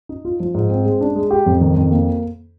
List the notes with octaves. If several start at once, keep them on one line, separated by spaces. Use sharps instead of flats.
D#4
F4
F3
G#2
C4
G#3
D4
G#3
G4
F2
D#3
F2
A#3